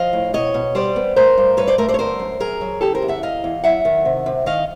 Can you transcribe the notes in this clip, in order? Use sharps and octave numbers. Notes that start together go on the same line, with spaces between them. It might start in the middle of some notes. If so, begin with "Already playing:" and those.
Already playing: F3 D#5 F5
A2
B2 C#5 D#5
B2
G3 C5 D5
B3
A3 A#4 C5
G2
G2 B4 C#5
C5 D5
A3 A#4 C5
C5 D5
C#5
D3 A#4 C5
F#2
F#2 G#4 A#4
F#3
C#3 G4 A4
A#4 C5
E2
E5 F#5
E2 D#5 F5
E2
F#3 E5 F#5
D#3
C3
C3
D#3 D#5 F5